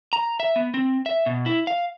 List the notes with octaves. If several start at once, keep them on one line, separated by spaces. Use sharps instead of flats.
A#5
E5
B3
C4
E5
B2
E4
F5